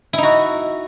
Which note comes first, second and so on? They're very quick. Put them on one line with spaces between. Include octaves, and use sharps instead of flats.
E4 D#4 F#4